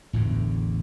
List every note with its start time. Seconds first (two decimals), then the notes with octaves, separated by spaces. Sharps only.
0.13 A1 E2 A2 D3